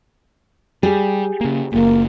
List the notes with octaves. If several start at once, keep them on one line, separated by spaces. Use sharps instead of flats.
G3 G4 G#4
C#3 A#3
F#1 A#2 A#3